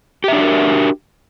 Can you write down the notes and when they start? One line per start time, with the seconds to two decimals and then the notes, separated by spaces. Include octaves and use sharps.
0.24 G4
0.28 E5
0.33 D4
0.37 F#4
0.41 A#4